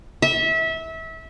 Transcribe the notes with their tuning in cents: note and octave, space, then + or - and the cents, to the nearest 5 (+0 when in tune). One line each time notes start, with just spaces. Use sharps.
E5 -25